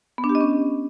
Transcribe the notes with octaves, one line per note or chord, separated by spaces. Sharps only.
B3
D4
G4
D#5
C#4